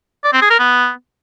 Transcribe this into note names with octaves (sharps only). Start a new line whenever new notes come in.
D5
C4
G#4
A#4
B3